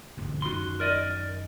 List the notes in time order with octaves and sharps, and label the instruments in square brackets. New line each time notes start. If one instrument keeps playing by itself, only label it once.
[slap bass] G1 D2 G#2
[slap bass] F#2 D#3 [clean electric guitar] F#4 C6
[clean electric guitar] A#4 D5 D#5